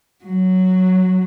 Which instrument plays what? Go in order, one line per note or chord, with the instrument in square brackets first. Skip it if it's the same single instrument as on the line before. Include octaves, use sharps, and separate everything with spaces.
[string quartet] F#3